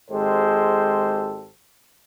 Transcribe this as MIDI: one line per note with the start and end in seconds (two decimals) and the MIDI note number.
0.11 1.49 32
0.11 1.49 56
0.11 1.49 67
0.11 1.49 69
0.11 1.49 72